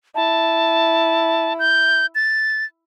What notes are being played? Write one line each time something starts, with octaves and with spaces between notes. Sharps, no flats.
E4 A5
G6
A6